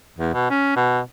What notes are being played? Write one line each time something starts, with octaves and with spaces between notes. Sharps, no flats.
E2
B2
C#4
B2